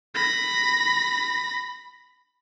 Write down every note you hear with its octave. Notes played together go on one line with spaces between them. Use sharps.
B5 A#6